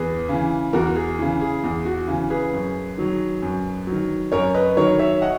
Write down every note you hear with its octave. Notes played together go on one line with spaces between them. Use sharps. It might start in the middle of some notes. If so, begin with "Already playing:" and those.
Already playing: E2 G#4 B4
C#3 E3
E2 F#4 A#4
G#4
C#3 E3
G#4
E2 G#4
F#4
C#3 E3
G#4 B4
F#2
D#3 F#3
F#2
D#3 F#3
F#2 A#4 C#5
B4 D#5
D#3 F#3 A#4 C#5
C#5 E5
D#5 F#5